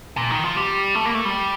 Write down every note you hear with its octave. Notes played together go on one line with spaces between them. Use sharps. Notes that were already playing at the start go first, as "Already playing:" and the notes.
A#2
D#3
F3
G3
A3
A#3
A3
G3